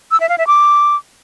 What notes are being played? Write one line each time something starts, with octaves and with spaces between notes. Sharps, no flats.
E6
E5
F5
E5
D6